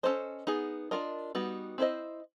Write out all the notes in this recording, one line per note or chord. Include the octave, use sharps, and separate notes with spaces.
C#4 F4 A4 C5 D#5
B3 D#4 G#4
D4 F4 A#4 D#5
G3 B3 D#4 F#4
C4 E4 A4 C5 D#5